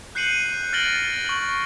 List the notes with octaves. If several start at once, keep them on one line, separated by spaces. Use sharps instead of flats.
F#6 G6 C7 C#7 D#7 F#7
F6 A6 A#6 D7 F#7 G7
C#6 F#7